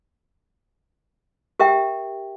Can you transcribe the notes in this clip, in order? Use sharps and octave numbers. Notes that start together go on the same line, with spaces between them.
G4 A#4 E5 G5